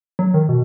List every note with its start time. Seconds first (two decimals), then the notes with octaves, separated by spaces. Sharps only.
0.19 F#3
0.34 D#3
0.49 B2